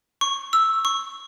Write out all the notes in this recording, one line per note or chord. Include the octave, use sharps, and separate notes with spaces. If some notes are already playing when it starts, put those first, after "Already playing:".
C#6
E6
C#6